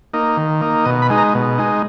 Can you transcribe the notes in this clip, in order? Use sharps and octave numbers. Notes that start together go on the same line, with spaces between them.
A#3 D#4
D#3
A#3 D#4
B2 D#5
B5
G#3 D#4
A#5
B2
G#3 D#4